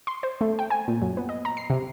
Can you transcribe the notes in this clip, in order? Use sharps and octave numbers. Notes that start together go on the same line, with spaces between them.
C6
C5
A3
G5
G#5
A#2
F#2
B3
D#5
A#5
C7
C3